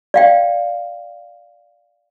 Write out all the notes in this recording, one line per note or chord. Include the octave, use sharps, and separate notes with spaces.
D5 F5 G5